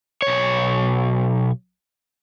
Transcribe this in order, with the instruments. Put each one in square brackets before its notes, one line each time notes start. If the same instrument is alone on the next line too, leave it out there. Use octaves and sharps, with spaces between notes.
[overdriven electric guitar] B1 C#5